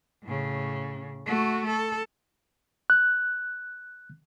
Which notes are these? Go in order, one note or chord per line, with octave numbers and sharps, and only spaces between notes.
A2 C#3
A3 F#4
A4
F#6